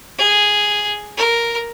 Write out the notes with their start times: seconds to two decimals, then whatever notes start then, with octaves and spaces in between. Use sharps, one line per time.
0.18 G#4
1.17 A#4